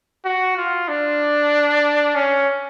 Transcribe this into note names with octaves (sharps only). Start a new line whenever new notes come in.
F#4
F4
D4
C#4